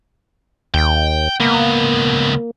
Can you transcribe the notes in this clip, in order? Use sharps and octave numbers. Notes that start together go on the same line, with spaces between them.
D#2 G5
C#2 A#3 B3